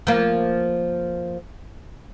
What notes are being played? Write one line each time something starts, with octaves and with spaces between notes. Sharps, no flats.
F3 A#3